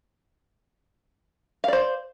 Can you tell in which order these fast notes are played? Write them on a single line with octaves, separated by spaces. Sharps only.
F5 D5 C5